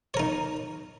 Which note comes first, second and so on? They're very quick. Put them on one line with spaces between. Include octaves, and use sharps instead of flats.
C#5 A#4 D#4